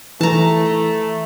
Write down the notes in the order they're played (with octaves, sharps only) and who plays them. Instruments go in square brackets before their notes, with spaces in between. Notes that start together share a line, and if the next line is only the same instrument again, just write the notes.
[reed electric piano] E3 [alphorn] A3 [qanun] A5 A#5